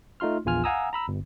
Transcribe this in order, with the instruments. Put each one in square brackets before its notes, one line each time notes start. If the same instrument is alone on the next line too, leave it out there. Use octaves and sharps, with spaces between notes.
[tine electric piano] A3 D#4 F4 C6 F6
A#1 E2 F4 G#5 F6
F5 F#5 G#5 A#5 D#6 E6
A#5 B5 E6
G1